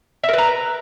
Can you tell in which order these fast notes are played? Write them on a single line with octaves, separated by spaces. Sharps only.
E5 A#4 B4 A#5